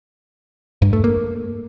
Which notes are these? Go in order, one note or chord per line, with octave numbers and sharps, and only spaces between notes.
G2
A3
A#3